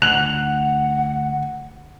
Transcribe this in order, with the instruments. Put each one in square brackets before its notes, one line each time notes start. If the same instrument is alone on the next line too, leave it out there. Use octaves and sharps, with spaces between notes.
[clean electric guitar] D2 [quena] F#5 [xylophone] F#6 [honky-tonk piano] F7 F#7